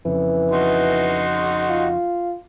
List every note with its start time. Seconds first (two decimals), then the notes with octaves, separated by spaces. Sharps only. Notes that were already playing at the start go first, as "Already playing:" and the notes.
0.05 F2 C#3 E3
0.52 D#4 F#4 C6
1.70 F4